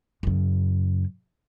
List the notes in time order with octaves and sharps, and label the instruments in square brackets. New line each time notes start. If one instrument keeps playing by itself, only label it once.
[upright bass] F#2 C#3